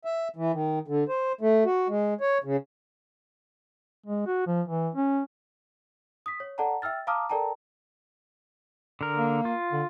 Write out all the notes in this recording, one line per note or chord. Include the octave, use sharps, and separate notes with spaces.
E5
E3
D#3
D3
C5
A3
F#4
G#3
C#5
C#3
G#3
F#4
F3
E3
C#4
D#6 B6
C#5
A4 D5 F#5 A5 A#5
E5 G5 E6 F6 A6
F5 A5 A#5 D6 D#6 F6
A4 A#4 D5 G5 A5 A#5
D3 A#4
A#3
F4
D3